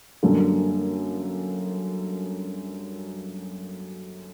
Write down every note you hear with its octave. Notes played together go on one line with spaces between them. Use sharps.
F#2 D3 G3 A#3